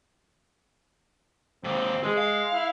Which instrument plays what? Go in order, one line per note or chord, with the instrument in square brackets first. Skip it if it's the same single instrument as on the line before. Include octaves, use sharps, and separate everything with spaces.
[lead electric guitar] D#2 G#2 [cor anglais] C4
[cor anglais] G#3 [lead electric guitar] G#4 B4
[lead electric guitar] F5
[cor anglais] E4